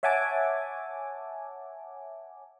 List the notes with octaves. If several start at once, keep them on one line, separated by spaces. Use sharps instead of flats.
C#5 E5 F#5 G#5 A5 D6